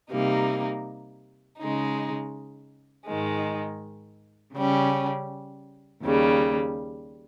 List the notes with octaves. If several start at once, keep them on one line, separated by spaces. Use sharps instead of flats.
C3 G3 A#3 D#4
C#3 G#3 D#4
G#2 D#3 G#3
C#3 G3 C#4
D#2 C#3 G3